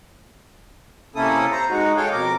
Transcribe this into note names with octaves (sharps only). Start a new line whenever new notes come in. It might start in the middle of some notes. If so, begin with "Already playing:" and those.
C3 A#3 C#4 E4 A4 D#6
C5 A#5
G#3 D#4 F#4
G#3 G#4 A4 C#5 F5 G5
F2 B2 A#4 D6